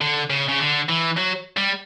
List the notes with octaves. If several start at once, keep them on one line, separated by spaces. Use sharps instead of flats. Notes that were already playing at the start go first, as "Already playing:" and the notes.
D3
C#3
C#3
D3
E3
F#3
G3